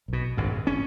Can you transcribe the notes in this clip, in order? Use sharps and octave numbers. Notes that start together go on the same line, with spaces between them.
B1 B2
G#1 G2
C#4